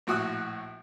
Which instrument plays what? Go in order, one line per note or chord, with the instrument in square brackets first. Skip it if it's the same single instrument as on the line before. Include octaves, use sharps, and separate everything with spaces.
[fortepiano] A#1 A2 F#4 F#5 D#6 F#6